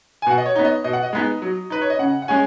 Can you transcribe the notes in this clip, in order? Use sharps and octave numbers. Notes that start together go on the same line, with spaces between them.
G#5
B2 F#5
D#5
C#5
B3 D#4
D#5
B2 D#5
F#5
D#5
G#3 B3 D#4
F#3
D#4 B4
C#5
D#5
C#3 F#5
F#5
G#3 C#4 G#5